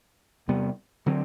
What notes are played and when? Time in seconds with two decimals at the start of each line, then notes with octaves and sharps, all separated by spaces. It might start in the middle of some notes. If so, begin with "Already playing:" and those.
0.48 E2 C3 G3 B3
1.06 D3 F#3 C4